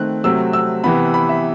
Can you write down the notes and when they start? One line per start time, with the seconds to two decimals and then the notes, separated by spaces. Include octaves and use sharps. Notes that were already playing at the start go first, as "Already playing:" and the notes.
Already playing: D#3 A3 C4 F#6
0.24 C3 F#3 A3 C4 E6
0.53 E6
0.84 C3 E3 B3 B5
1.14 B5
1.29 E5